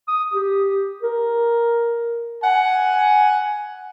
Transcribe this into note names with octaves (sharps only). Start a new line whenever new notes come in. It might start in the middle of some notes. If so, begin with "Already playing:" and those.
D#6
G4
A#4
F#5 G#5